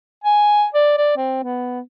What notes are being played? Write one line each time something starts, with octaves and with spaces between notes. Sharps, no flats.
G#5
D5
D5
C4
B3